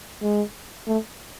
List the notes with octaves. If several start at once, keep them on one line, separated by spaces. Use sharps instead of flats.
G#3
A3